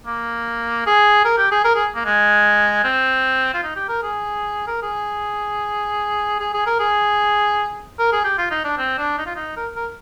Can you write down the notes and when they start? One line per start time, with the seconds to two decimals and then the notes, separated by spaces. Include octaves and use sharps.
0.07 A#3
0.87 G#4
1.25 A#4
1.38 G4
1.52 G#4
1.65 A#4
1.75 G#4
1.95 A#3
2.05 G#3
2.84 C4
3.54 F4
3.64 D#4
3.76 G4
3.89 A#4
4.03 G#4
4.68 A#4
4.83 G#4
6.40 G#4
6.54 G#4
6.67 A#4
6.80 G#4
7.99 A#4
8.13 G#4
8.25 G4
8.38 F4
8.51 D#4
8.64 D4
8.78 C4
8.98 D4
9.18 D#4
9.26 F4
9.36 D#4
9.57 A#4
9.76 A#4